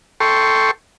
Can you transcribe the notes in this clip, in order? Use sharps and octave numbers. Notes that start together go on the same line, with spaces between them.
A4 G5 C6 C#6